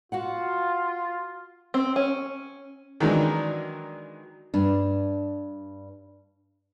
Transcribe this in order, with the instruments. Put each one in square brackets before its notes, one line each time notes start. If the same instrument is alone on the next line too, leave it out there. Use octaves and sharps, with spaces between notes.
[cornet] F4 [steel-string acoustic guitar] F#4 F5 F#5
[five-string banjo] C4
C#4
[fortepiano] D#3 E3 F#3 G#3 D4 D#4
[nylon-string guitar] G2 D4